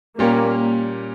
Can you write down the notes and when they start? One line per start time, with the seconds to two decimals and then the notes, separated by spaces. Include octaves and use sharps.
0.19 A#2 G3 A#3 C#4 G4